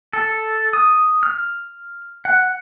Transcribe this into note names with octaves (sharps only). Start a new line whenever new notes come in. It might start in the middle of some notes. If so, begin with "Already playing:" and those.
A4
D#6
F6
F#5